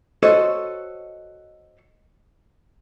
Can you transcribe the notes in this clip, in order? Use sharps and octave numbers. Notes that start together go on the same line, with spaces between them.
F#4 A4 C5 C#5 D#5